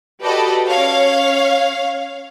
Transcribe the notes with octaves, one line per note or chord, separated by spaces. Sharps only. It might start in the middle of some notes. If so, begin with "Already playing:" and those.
F#4 G4 A4 B4 D5 D#5
C#4 C#5 F5